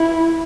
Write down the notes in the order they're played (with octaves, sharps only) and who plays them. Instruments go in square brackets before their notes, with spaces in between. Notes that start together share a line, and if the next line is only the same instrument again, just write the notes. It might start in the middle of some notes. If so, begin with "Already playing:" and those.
Already playing: [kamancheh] E4